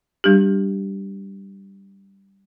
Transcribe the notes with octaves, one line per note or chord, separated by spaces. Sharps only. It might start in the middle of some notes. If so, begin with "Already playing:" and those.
G3 D4 G4